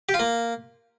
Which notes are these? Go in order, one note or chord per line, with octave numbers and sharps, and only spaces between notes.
G4
F4
A#3